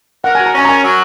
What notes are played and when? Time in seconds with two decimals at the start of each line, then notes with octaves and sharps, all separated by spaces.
0.24 A#4 F#5
0.35 F#4 G#5
0.46 A#5
0.54 C#4 G#5
0.65 A#5
0.68 A#4 G#5
0.83 F#3